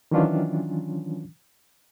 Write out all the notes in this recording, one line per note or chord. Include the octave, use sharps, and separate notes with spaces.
D#3 E3 F#3 C#4 D4 F4